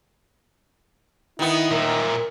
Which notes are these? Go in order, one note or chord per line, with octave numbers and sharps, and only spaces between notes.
D#3 B3 E4
A#2 A#4 E5